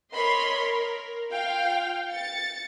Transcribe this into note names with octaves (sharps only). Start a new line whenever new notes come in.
A#4 C#5 D#5 B5 C6
A#4
F4 F5 G5
A6 C#7